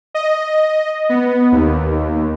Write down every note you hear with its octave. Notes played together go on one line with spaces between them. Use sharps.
D#5
B3
D#2